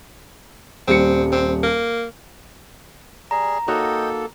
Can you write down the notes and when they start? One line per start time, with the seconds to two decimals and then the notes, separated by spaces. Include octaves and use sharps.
0.88 D#1 G3 C4 C#7
1.32 C4
1.63 A#3
3.31 G3 G#4 A#5
3.68 A#3 D#4 F#4 A4 C#5 D#5 G5